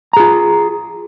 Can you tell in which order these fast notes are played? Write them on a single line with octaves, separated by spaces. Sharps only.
A#5 G#4 F4